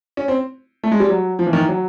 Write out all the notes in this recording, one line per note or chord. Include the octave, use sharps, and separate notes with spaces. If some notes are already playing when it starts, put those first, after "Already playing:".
C#4
C4
A3
G#3
G3
F#3
F3
E3
D#3
E3
F#3